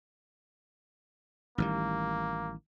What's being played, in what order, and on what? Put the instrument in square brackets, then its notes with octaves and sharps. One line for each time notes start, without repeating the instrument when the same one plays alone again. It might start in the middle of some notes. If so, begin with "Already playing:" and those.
[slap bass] A1 D#3 G3 [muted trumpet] A#3